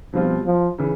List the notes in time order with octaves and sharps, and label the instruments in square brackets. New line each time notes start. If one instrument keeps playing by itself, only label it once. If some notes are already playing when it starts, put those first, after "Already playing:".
[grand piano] B2 G3 C4 F4 [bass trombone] F3
[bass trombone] F3
[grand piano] C#3 E3